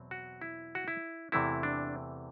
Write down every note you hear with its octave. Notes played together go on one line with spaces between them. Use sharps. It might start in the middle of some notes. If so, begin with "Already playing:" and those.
Already playing: E2 B2 F#3 C4
F#4
E4
F#4
E4
E2 C3 E3 A3 C4 E4
D4